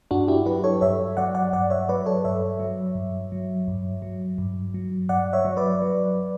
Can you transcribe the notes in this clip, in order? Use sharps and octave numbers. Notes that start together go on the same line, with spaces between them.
G2 D4 F#4
E4 G4
F#3 G4 B4
A4 C#5
G2 C#5 E5
F#3 D5 F#5
D5 F#5
G2 D5 F#5
C#5 E5
F#3 B4 D5
A4 C#5
G2 C#5 E5
F#3
G2
F#3
G2
F#3
G2
F#3
G2 D5 F#5
C#5 E5
F#3
B4 D5
F#3